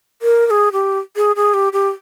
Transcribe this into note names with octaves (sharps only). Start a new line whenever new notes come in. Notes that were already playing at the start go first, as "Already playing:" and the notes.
A#4
A#4
G#4
G4
G#4
G#4
G4
G4